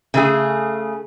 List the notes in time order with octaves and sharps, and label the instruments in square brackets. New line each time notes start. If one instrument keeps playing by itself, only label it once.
[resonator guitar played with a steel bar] C#3 A3 G#4